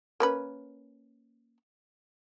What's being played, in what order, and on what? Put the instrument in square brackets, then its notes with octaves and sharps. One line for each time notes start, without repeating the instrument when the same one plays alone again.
[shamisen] A#3 C#4 B4